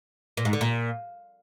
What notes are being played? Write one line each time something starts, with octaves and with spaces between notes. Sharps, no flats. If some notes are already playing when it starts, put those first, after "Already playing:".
A#2
G#2
D3
A#2